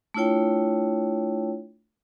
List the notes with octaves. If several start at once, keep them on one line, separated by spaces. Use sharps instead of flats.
A3 D4 E4 F4 C#5 G5